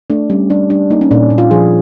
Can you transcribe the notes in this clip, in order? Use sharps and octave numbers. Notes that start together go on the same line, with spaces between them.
A3 D4
G3 C#4
G3 D4
G3 D4
A#3 D#4
C#4
A#2 D4
A#2
F4
F3 G#4